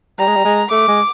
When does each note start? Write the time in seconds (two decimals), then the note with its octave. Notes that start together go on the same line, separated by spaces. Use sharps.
0.19 G3 A#5
0.28 G#3
0.36 G3
0.45 G#3
0.71 A3 D6
0.88 G#3